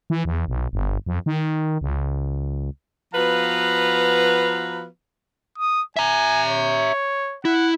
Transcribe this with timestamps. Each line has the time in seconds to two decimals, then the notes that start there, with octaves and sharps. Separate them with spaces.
0.10 E3
0.25 E2
0.48 B1
0.73 G1
1.06 F2
1.26 D#3
1.81 C#2
3.14 F3 B3 F#4 B4 F5 A#5
5.58 D#6
5.96 E5 G#5 A#5
6.48 C#5
7.45 E4 F#5